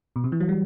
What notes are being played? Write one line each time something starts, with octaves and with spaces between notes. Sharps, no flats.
B2
C3
E3
F#3
G3